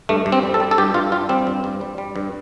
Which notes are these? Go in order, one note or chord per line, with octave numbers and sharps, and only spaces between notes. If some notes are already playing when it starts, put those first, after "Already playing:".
G2 A3
G2
C4
G3
A4
G3
A4
G2 G4
G2 F4
G3 F4
G3 C4
G2
G2
G3
G3
G2